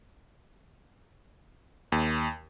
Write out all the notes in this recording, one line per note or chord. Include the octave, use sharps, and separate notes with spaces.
D#2